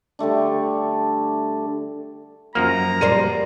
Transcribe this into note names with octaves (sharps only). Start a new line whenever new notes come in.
D3 G3 A3 D4
F#2 F3 A#3 A#5 F6
G3 A#4 C5 D5 D#7